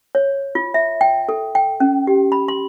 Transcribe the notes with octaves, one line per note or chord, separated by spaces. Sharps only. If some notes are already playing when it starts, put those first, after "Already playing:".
C#5
F4
E5
G5
A4
G5
C#4
G4
B5
C6